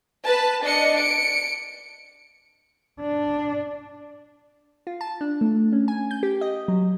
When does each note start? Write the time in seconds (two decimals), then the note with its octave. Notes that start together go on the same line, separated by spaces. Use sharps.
0.25 B4 A5
0.63 D4 D#5 C#7
0.99 C#7 D7
3.01 D4
4.87 F4
5.01 A5
5.21 D4
5.41 A3
5.72 C#4
5.88 G#5
6.11 G6
6.23 G4
6.41 D#5
6.68 F#3